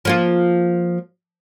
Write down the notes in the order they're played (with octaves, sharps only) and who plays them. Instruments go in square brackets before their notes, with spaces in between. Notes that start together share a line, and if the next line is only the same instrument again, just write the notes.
[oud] F3 A#3 F4